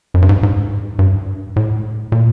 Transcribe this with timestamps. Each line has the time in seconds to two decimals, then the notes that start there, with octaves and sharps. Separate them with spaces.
0.14 F#2
0.22 G2
0.29 G#2
0.43 G#2
0.99 G2
1.56 A2
2.12 A#2